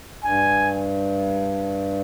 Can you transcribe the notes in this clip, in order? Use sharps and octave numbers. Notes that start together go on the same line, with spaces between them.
G2 G#5